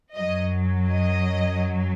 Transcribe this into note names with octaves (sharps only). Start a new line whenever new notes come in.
F#2 F#3 D#5
D#5